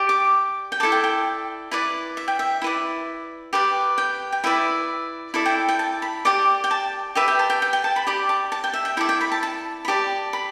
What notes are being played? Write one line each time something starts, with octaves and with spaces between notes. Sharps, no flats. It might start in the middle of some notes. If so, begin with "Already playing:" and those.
Already playing: G4 D5
D6
G5
E4 A4 D5 A5
G5
G5
E4 B4 D5
E5
G5
E5
E4 B4 D5
G4 B4 D5
G5
G5
E4 B4 D5 E5
E4 A4 D5 E5
G5
G5
A5
B5
G4 D5 D6
G5
A5
G4 B4 D5 E5
G5
A5
G5
G5
G5
A5
B5
G4 D5 B5
A5
A5
G5
E5
G5
E4 A4 D5 E5
G5
B5
A5
A5
B5
G4 D5 A5
B5